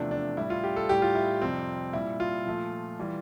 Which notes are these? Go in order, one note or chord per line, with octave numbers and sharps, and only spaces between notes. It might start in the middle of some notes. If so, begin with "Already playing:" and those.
Already playing: E2 C3 F3 A3 D4
D4
A2 G3 E4
F4
G4
A4
A2 G3 G4
F4
E4
F2 C3 G3 C4
A#2 G3 E4
F4
A#2 F3 A3
E3 G3